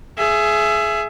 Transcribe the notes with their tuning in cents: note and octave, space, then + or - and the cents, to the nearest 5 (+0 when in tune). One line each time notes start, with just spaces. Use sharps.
G#4 +20 E5 +25